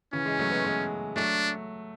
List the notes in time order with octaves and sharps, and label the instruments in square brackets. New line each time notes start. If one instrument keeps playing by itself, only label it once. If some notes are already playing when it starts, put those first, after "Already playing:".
[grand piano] C#3 E3 [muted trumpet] C#4
[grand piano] E3 G#3
F#3 A3
G#3 B3
G#3 B3
[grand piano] F#3 A3 [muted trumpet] D4